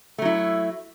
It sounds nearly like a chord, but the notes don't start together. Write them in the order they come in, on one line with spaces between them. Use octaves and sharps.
A3 F#3 E4